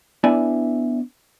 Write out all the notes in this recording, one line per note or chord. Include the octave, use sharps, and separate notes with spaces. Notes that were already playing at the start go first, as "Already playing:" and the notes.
B3 D4 E4 D5 E5 G#5